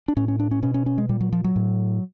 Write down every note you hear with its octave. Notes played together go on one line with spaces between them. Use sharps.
D4
A2 C#4
C#4
D4
C#4
B2 C#4
C#4
C#4
G#3
A#2 G3
F#3
F3
F#3
A2